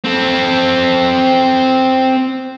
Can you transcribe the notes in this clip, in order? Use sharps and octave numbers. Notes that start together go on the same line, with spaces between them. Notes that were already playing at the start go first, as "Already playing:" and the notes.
C4 A4